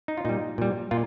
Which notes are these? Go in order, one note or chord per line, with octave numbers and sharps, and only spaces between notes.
D#4
F4
A#2 G3 D#4
A#2 G3
A#2 F4